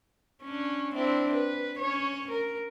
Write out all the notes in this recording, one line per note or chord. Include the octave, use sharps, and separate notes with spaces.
C#4 D4
C4 D4 E4
B4
C#4 C#5
A#4